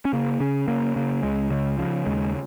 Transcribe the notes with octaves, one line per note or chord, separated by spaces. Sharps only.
C#4
C#3 A#3
C#3 C#4
C#3 A#3
C#3 A#3
C#2 G#3
C#3 G#3
C#3 F3
D#2 G#3